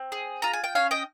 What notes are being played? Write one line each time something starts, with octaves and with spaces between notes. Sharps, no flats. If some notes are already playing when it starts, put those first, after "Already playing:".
Already playing: C4
G#4
F4 A#5
G#5
G5
C#4 C#5 F5
D#5 G5